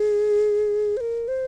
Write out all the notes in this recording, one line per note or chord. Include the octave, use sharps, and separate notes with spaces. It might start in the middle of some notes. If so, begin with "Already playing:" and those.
Already playing: G#4
C5
A#4
C5